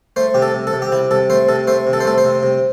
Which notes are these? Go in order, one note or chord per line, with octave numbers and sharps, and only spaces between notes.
A3 C5
C3 G4
A4
C3
A4
C3
G4
C3 E4
C3 A4
A3 C5
C3 A4
A3 C5
C3
A4
C5
A3 A4
C5
C3
C3